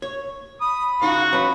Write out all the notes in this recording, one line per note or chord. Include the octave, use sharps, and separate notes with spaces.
C#5
B5 D#6
C#3 D#4 F4 F#4
F#3 C#4 D#4 B4